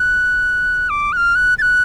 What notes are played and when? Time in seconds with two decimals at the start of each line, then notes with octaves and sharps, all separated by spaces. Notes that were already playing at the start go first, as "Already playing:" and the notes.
Already playing: F#6
0.90 D6
1.13 F#6
1.17 F6
1.35 F#6
1.58 A6
1.62 F#6